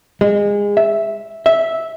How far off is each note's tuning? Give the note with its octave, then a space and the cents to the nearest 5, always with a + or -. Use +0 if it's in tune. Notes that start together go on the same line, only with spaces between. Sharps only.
G#3 -25
E5 -5
E5 -10